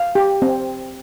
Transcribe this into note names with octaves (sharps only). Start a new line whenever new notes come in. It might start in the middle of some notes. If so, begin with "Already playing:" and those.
Already playing: F5
G4
C4